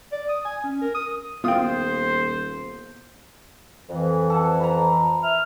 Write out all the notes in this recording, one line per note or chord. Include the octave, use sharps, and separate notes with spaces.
D5
D#6
G#5
C#4
A#4
D#6
D#1 B3 F4 C5 G5 D#6
F2 E3
A4 F#5 A5
A#5 B5
E5 F6